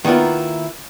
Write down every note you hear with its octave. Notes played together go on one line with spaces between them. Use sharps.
D#3 A#3 B3 E4 F4